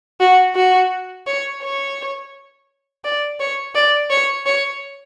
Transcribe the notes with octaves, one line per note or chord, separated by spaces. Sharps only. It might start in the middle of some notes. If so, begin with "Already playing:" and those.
F#4
F#4
C#5
C#5
D5
C#5
D5
C#5
C#5